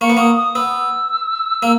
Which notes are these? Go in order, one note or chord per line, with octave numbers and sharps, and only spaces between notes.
A#3 C#6
B3
A#3 D#6
D#6
B3 E6
A#3